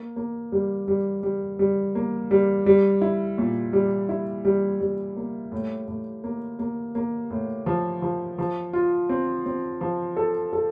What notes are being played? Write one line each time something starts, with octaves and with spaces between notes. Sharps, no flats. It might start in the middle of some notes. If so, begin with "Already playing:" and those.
Already playing: A#3
A#3
G3
G3
G3
G3
A#3
G3
G3
E4
A#2
G3
E4
G3
G3
A#3
A2
A2
A#3
A#3
A#3
A2
F3
F3
F3
F4
C4
C4
F3
A4
A4